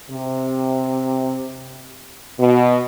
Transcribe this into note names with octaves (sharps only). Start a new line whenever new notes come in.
C3
B2